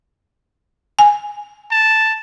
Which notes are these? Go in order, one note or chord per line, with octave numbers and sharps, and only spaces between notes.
G#5
A5